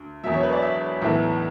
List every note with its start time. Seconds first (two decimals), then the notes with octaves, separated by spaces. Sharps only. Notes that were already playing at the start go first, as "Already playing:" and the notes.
Already playing: D2
0.23 E1 E2 B2 F#3 E5
0.34 C#5
0.43 B4
0.53 D5
0.62 E5
1.02 B1 A2 E3 B3 E4